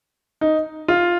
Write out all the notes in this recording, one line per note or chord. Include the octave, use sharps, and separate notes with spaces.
D#4
F4